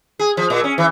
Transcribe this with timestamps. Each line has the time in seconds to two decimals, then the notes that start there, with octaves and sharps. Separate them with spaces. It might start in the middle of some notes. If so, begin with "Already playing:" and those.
0.19 G#4
0.37 F3
0.50 A#2
0.64 C#4
0.78 E3